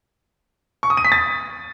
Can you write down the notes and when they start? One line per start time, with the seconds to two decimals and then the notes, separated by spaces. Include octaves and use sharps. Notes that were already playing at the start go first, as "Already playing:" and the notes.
0.83 C#6
0.90 D#6
0.97 D#7
1.05 B6
1.12 A6